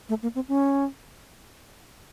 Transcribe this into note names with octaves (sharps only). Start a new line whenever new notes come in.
A3
A#3
C4
C#4